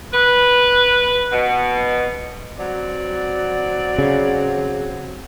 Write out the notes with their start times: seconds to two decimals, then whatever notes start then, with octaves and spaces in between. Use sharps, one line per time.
0.13 B4
1.32 B2
2.59 F#3 C4 F#4 D5
3.98 C#3